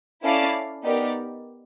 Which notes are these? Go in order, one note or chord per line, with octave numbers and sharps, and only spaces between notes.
C#4 E4 A4 D5 F5
B3 D#4 G4 A#4 D5